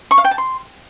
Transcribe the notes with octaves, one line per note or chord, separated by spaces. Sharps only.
C#6
F5
G5
A5
C6